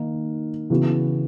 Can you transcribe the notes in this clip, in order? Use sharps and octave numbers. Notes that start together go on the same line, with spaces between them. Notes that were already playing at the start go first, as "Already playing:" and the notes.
Already playing: D#3 A#3 D#4
C#3 E3 B3 F#4